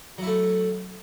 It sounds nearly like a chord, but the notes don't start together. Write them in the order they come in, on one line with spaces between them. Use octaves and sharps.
F#3 E4 A3